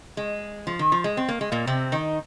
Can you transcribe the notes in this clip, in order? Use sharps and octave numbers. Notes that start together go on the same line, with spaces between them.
G#3
F3
D#3
F3
G#3
C4
A#3
G#3
A#2 A#3
C3 C4
D#3 D#4